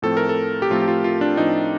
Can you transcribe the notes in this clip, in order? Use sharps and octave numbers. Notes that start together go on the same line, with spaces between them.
A2 F3 A3 C4 A4
A#4
A4
G4
A2 F3 A3 C4 F4
G4
F4
F4
D4
A2 F3 A3 C4 D#4